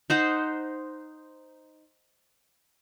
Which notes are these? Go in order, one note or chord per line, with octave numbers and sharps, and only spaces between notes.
D#4 C5 F#5